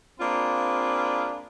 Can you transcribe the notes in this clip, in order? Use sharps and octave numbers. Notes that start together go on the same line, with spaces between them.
A#3 C4 D4 F4 G#4 B5